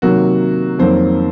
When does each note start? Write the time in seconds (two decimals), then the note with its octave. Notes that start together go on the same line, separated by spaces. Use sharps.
0.02 C3 D#3 F#3 A#3 F#4
0.79 F2 D#3 F#3 A#3 C5